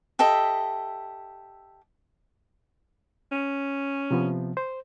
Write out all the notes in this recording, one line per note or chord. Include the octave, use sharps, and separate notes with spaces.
G4 A4 D#5 E5
C#4
C3 F3 B3
C5